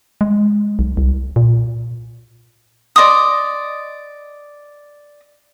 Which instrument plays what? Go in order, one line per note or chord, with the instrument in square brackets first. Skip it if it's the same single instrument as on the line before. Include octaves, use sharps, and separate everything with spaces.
[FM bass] G#3
B1
C2
A#2
[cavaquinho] D5 D#5 C6 D#6